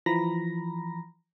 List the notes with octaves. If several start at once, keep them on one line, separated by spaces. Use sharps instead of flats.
E3 F3 A#5 B5 A#6